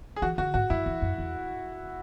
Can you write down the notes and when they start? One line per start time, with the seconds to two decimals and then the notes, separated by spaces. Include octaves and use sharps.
0.16 G#4
0.22 E3 F#4
0.38 D3 F#4
0.54 G#2 F#4
0.70 F#2 E4
0.86 E2
1.02 F#2
1.18 E2